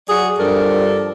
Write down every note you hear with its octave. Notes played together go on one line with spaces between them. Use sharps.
F#3 F#4 G#4 D5
G2 F3 A4 A#4 D5